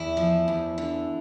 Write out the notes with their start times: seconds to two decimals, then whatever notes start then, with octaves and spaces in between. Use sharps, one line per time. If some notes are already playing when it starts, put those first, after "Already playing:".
Already playing: E2 E4
0.17 F3
0.48 E2
0.78 D3